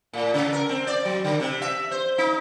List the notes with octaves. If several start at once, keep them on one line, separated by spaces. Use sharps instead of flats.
A2
C#3
A#4
C4
D5
F#3
D3
C3
E5
C5
D#4